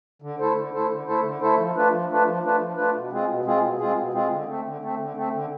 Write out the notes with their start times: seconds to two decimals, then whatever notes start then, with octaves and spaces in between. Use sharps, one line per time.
0.22 D3
0.39 A3 E4 A4 C5
0.56 D3
0.73 A3 E4 A4 C5
0.90 D3
1.06 A3 E4 A4 C5
1.24 D3
1.41 A3 E4 A4 C5
1.58 F3
1.76 A3 D4 F4 B4
1.92 F3
2.10 A3 D4 F4 B4
2.26 F3
2.44 A3 D4 F4 B4
2.60 F3
2.77 A3 D4 F4 B4
2.94 B2
3.11 G#3 C4 F4 G#4
3.28 B2
3.45 G#3 C4 F4 G#4
3.62 B2
3.79 G#3 C4 F4 G#4
3.97 B2
4.13 G#3 C4 F4 G#4
4.31 D3
4.47 A3 C4
4.64 D3
4.81 A3 C4
4.99 D3
5.15 A3 C4
5.32 D3